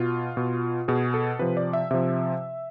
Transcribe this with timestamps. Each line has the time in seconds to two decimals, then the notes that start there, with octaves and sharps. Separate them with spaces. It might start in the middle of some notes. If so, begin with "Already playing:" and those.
Already playing: B2 F4
0.37 B2
0.88 B2 G#4
1.14 A4
1.39 C3 F3 B4
1.57 D5
1.73 E5
1.91 C3 F3 E5